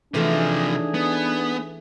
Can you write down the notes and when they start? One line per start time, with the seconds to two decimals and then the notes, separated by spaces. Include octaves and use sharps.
0.14 C3 E3 F3 A3 D4 D#4 G#4 D#5
0.94 B3